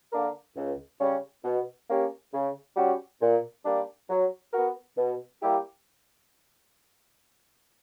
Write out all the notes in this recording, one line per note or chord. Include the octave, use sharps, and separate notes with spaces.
D3 A#3 D4 A#4
C#2
C#3 G3 C#4
B2
A#3 C#4 G4
C#3
G3 C#4 F#4
A#2
G3 A#3 D4
F#3
B3 F#4 A#4
B2
G3 A#3 E4 G4